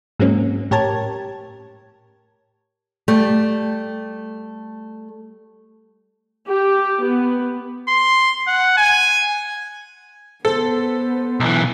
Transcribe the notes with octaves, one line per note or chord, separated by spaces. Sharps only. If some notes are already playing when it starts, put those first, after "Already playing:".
G#2 F#3 G#3 A#3 C4 C#4
A2 G4 A#4 C#5 A5 G#6
G3 A3
G4
B3
C6
F#5
G#5
B3 A4 C5
B1 E3